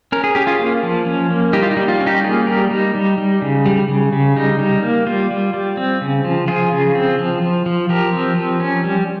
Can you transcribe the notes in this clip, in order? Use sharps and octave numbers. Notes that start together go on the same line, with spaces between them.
C#4 A#4
G#4
C#4 G4
F4 G#4
A#3
F3
C#4
A#3
G3 D#4 G4
F4
D#4
G3
F4
C#4
D#4 G4
A#3 F4 G#4
G3 G4 A#4
G3 D#4
G3
G3
C#3
G3
C#3
C#3
G3 D#4
G3
A#3
G3 F4
G3
G3
C4
C#3
F3
F3 F4 G#4
C#3
C4
F3
F3
F3
F3 G4 A#4
C4
F3
C#4
G3